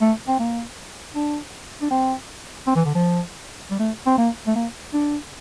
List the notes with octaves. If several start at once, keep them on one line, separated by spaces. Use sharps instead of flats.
A3
C4
A#3
D4
D4
C4
C4
E3
D3
F3
G3
A3
C4
A#3
A3
A#3
D4